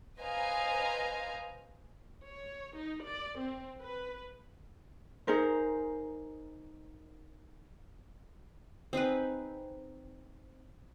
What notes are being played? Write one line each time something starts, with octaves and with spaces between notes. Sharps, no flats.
B4 C5 D#5 F5 G#5 A#5
C#5
D#4
D5
C4
B4
D#4 G#4 A#4 C5
C4 D#4 G#4 B4